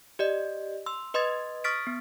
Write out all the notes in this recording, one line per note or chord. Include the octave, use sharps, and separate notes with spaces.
G4 D5 D#5
C6 E6
B4 D#5 C6 D#6 G#6 A6
C#6 D#6 F6 A6 B6 D7
B3